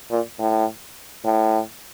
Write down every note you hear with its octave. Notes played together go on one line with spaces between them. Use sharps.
A#2
A2
A2